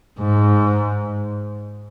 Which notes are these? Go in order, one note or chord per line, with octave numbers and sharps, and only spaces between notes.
G#2